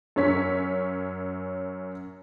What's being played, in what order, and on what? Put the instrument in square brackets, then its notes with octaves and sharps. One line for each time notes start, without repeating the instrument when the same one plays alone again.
[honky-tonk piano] F#2 C#4 C#5 B6